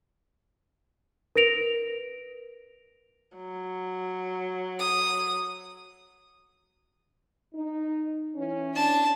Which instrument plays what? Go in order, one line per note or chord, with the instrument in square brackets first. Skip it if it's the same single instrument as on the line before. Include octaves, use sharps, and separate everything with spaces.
[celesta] A#4 B4 A#6 D7 F7
[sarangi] F#3
[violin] D#6
[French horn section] D#4
E3 C#4
[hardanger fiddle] D4 A5